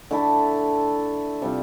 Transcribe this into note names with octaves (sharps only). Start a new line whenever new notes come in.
D3 A3 E4 A4
C3 G3 C4 F4